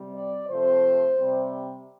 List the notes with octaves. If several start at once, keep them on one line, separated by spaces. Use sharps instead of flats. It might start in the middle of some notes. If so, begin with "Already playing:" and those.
Already playing: C3 G3 C4
D5
C3 F3 A3 C4 C5
C3 G3 C4